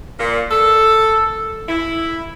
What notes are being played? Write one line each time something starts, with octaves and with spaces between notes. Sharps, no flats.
A#2
A4
E4